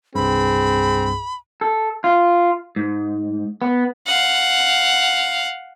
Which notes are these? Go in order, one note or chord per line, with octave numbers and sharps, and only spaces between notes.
C2 G2 C4 G#4 B5
A4
F4
G#2
B3
F5 F#5